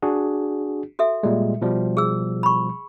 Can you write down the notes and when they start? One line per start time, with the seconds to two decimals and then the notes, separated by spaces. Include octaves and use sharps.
0.02 D4 F#4 G#4
0.99 F#4 A4 E5
1.23 A#2 G3 G#3
1.61 B2 F3 G3
1.97 G#4 E6
2.43 B5 C#6